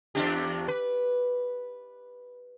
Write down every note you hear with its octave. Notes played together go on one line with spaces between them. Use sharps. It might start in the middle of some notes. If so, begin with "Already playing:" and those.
E2 D4 G4
B4